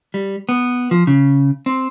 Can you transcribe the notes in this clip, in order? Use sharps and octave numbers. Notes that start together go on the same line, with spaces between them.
G3
B3
F3
C#3
C4